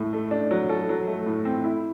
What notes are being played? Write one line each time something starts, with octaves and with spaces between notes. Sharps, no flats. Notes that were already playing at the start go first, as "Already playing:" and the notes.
Already playing: A2
A3
D4
F#3
A4
F#3
A3
A2
C4
E4